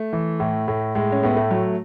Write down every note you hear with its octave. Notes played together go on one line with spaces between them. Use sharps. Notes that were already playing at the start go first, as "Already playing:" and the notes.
Already playing: A3
E3
A2
A2
A2 G#3
C#4
A2 B3
A3
F#3